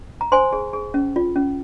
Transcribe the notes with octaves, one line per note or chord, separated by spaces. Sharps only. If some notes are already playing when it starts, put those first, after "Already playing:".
A#5
C5 G#5 C6
G#4
G#4
C#4
F4
C#4